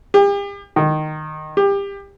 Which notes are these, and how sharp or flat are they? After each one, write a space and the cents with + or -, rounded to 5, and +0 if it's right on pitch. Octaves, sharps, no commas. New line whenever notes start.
G4 +40
D#3 -10
G4 +25